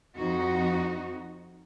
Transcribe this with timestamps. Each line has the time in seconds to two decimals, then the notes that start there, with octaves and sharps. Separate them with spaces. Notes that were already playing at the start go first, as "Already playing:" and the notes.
0.16 F2 D#4 F#4